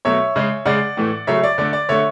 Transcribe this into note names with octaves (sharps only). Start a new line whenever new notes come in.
B2 F#3 A3 C#5 E5
C#3 G#3
C#3 G#3 D5 F#5
A2 E3 A3
C#3 F#3 A3 C#5 E5
D5
D3 A3 D5
D5
D3 A3 C#5 E5